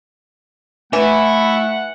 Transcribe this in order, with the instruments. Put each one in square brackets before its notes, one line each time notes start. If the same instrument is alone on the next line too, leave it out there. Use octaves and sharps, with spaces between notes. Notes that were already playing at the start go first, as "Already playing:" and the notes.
[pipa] E3 [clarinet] A3 [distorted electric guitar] E4 [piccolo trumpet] F#5